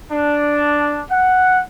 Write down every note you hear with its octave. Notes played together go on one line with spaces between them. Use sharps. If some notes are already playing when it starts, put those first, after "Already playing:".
D4
F#5